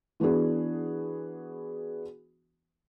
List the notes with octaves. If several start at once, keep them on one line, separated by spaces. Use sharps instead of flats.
E3 B3 D4 F#4 G#4